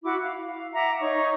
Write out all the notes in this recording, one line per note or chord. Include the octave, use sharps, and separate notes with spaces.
E4 F#4 D6
F5
F5
E5 F#5 A#5 D6
D#4 C#5 C#6